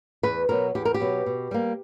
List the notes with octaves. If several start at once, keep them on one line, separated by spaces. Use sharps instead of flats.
E2 B4
B2 F#3 B3 A#4
E2 G4
A#4
G4
B2 F#3 B3
B2
G3 A#3